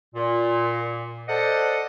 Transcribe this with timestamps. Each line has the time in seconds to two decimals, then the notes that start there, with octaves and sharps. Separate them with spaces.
0.15 A#2
1.28 A4 C5 D5 D#5 F#5